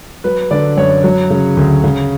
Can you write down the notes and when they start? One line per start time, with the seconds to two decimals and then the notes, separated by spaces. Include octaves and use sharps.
0.24 F#3 B4
0.51 D3 D5
0.77 F#2 C#5
1.04 F#3
1.30 C#3
1.57 D2
1.84 C#3